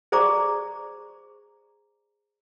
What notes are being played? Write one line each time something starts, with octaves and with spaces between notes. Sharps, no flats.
G#4 C5 D5 A#5 C#6 D6